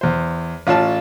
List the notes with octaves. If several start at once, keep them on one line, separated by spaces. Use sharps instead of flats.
E2 C5
A1 F4 C#5 F5 A5